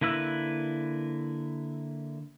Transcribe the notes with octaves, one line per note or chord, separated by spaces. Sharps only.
D3 A#3 E4 B4 E6